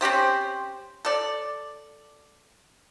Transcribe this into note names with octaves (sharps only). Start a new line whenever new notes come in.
C4 C#4 G4 C5
A4 D5